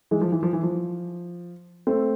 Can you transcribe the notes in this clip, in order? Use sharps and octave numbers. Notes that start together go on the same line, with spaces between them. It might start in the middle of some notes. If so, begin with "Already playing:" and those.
E3 G#3
F3
E3
F3
E3
F3
A3 C4